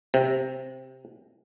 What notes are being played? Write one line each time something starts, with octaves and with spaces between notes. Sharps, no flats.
C3